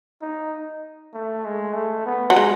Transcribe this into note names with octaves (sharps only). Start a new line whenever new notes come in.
D#4
A3
G#3
A3
B3
F#3
G#3